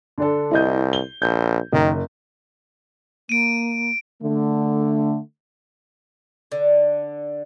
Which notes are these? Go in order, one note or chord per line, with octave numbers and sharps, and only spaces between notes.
D3 D4 A4
C2 E4 D#5 G6
G7
A#1 G6
F#1 D#3
A#3 D7 D#7
D3 A3
D3